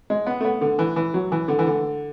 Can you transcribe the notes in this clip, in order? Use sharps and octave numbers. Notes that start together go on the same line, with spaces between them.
G#3
B3
A3
B3
D3
E3
E3
F#3
E3
D3
E3
D3